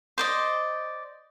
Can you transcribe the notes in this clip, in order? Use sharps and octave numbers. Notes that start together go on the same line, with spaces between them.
C5 D5 D#5